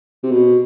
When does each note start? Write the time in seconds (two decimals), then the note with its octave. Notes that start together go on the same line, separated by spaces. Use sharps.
0.23 C3
0.31 B2